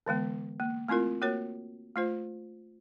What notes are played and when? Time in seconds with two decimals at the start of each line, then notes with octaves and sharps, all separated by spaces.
0.06 D3 E3 G#3 B3
0.60 A#3
0.88 A3 C4 E4 F4 A#4
1.21 A#3 F#4 A#4 C#5
1.96 A3 F4 C5